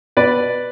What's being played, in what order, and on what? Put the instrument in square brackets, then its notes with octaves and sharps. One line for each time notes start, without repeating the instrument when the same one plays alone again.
[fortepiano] B2 B4 D5